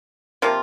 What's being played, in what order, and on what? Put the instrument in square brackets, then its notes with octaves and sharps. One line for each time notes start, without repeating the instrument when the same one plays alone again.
[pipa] C3 F3 A#3 F4